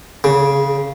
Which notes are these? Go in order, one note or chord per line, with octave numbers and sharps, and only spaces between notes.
C#3